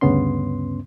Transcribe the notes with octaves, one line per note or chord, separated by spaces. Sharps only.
D2 G2 C#3 B3 C#4 C6